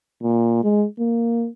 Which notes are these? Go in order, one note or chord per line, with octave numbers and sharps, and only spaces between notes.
A#2
G#3
A#3